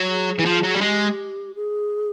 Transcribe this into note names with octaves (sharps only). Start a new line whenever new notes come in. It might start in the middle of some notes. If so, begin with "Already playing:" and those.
Already playing: F#3
G#4
E3
F3
F#3
G3
G#3 G4
G#4